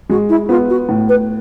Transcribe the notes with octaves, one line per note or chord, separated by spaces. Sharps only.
G#3 F#4
E4
B3 F4
F#4
A2
B4